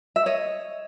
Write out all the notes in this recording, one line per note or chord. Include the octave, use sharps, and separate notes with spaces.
E5
C#5 D#5